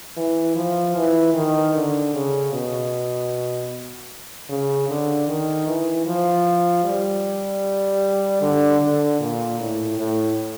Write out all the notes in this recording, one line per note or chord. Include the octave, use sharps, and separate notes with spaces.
E3
F3
E3
D#3
D3
C#3
B2
C#3
D3
D#3
E3
F3
G3
D3
D3
A#2
A2
A2